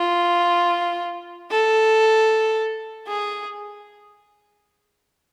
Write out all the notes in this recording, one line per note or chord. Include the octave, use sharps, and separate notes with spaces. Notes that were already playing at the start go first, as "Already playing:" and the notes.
Already playing: F4
A4
G#4